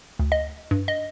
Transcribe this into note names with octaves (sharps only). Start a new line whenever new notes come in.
D2
D#5
G2
D#5